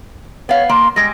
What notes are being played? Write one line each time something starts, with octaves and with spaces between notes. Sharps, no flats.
B3 C#5 F5
A#3 C6
G3 G#3 A#6